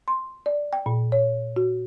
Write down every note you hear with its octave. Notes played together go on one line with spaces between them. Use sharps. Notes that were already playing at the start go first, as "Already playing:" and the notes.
C6
D5
G5
A#2
C#5
F#4